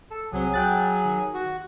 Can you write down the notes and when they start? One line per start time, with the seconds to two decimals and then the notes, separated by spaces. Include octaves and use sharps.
0.11 A4
0.32 C2 F#3 C4 G#4
0.54 F#3 G5 F#6 A6
1.05 D#3
1.34 F#4